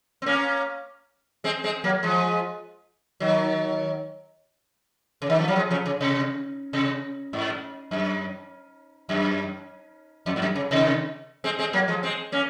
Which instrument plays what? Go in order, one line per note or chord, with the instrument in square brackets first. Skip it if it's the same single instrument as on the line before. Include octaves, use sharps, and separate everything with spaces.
[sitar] C4
A#3 C#4
G#3 C4
G#3 C4
F#3 A#3
F3 G#3
D#3 F#3
C#3
D#3
F3
F#3
F3 G#3
C#3 F3
C#3
C3
C3
G#2
F#2
F#2
F2
G#2
F#2
C#3
C3 D#3
G#3 C4
G#3 C4
F#3 A#3
F3 G#3
G#3 C4
A#3 C#4